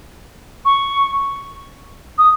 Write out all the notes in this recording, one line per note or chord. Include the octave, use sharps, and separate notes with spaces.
C#6
D#6